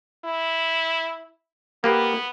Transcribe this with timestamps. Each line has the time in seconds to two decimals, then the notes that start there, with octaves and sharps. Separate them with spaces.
0.25 E4
1.84 A#3 B3 G4 B4